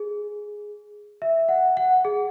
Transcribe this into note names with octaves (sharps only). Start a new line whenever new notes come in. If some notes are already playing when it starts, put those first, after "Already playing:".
Already playing: G#4
E5
F#5
F#5
G#4